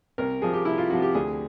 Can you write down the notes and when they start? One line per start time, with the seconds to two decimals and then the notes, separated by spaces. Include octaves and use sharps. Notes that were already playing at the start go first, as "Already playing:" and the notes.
0.18 C2 A#4
0.42 C3 F3 G#4
0.53 G4
0.65 C2 E4
0.78 F4
0.90 C3 F3 F#4
1.02 G4
1.14 D2 G#4